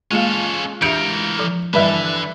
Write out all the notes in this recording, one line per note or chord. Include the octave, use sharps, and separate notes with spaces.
G#3 A#3 C#4 F4 A4 F5
E3 D4 G4 A#4 E5 G6 C#7 D7
F3 A4
G2 D3 E3 G3 B4 D5 E5